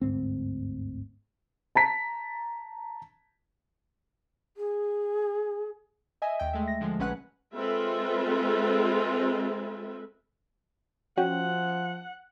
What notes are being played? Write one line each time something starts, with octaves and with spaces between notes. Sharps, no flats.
G1 D2 G#2 C4
A5 A#5 B6
G#4
D#5 E5 G#5
D#2 G5
G#3 A3 E5
A#6
D3 F3 G#3
A#1 F#3 C#4 B4 F#5 F#6
G#3 C4 F4 A4 B4 E5
F3 C#4 F#4 F#5 G5